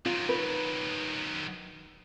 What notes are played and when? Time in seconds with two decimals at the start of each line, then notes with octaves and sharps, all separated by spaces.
0.06 D#3 F#3 F4
0.29 B4